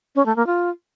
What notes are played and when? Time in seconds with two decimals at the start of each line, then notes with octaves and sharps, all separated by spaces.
0.15 C#4
0.26 A3
0.36 A#3
0.47 F4